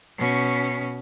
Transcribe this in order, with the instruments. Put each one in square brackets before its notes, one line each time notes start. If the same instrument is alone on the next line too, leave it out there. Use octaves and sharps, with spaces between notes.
[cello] B2 C#4